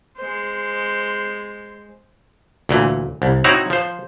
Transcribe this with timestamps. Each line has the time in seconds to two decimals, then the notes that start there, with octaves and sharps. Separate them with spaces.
0.17 G#3 C5
2.69 D2 A#2 E3
3.22 C2
3.44 C4 D#4 E4 F#4 C#5 A#5
3.70 F3 C5